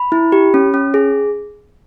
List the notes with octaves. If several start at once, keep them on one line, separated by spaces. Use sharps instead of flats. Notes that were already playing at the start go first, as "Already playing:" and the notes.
Already playing: B5
E4
G4
C#4
C#4
G#4